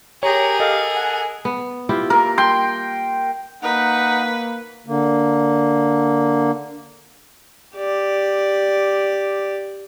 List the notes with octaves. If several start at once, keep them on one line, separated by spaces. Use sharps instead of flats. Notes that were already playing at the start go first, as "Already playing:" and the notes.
G4 G#4 A#4 C#5 A#5
A4 D#5 F5
F#5 G#5
B3
E4 F4 G4
A#3 A#4
G5 C6
A#3 D#4 B4 F#5
D3 A#3
G4 D5